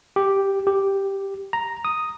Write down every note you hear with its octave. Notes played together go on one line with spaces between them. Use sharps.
G4
G4
A#5
D#6